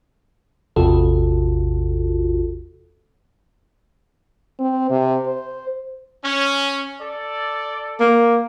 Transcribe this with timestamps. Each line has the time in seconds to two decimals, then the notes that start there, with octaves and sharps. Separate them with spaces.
0.76 A1 E2 C3 F4 F#4 A4
4.60 C4
4.90 C3
5.26 C5
6.25 C#4
7.01 A4 D5
8.00 A#3